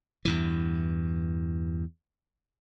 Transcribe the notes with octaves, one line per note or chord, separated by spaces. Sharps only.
E2 G2 E3